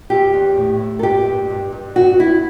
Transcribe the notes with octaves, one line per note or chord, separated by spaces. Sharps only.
E2 G4
E2
A2
A2
A4
G2 G4
G2
G2
G2
G2 F#4
G2 E4